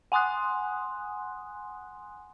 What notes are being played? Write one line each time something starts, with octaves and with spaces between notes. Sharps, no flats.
F#5 G#5 C6 D#6 F#6